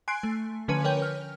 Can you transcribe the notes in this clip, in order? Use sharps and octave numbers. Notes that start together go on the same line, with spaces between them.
G#5 C6 F#6 C7 D7
A3
D3 F3 C#4 B4 G#5 D#7
A#4 B4 C#5 G5 G6
F6